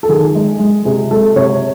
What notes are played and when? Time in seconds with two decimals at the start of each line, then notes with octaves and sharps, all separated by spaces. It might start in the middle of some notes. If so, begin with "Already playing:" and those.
0.03 A4
0.09 D#3 G#4
0.35 G#3
0.59 G#3
0.85 C3 G#4
1.11 G#3 A4
1.36 C3 C#5